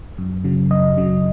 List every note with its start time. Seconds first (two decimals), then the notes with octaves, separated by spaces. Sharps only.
0.18 F#2
0.44 C#3 F#3
0.70 F#2 D#5
0.97 C#3 F#3